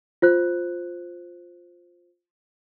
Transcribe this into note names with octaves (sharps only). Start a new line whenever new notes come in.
F4 C5 F#6